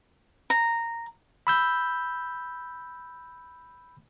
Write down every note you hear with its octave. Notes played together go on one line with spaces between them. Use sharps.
A#5
B5 E6 G6